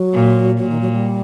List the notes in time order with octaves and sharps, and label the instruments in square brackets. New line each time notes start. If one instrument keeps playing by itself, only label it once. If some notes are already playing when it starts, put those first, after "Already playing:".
Already playing: [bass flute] F#3
[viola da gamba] A#2
[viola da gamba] A#2 [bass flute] F#3
[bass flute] D#3
F#3
G3